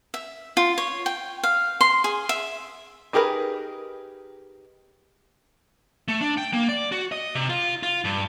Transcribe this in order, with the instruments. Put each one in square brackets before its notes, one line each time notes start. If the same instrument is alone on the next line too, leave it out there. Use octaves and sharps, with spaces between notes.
[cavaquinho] E5
F4
C#5
G5
F5
C6
G#4
E5
[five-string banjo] D#4 G4 G#4 A#4 B4
[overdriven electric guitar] A3
D4
G5
A#3
D5
F#4
D#5
C3
F4
F4
G2